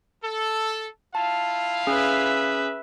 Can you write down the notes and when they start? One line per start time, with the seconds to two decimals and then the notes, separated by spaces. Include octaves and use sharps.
0.24 A4
1.15 E4 F4 F5 A5
1.87 C#4 G#4 B4 E5